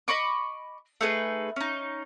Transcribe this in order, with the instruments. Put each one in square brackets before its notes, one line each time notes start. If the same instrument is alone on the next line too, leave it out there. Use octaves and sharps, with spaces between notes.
[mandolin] D#5 B5 C#6 D6
A3 D#4 G#4 B4
C#4 D#4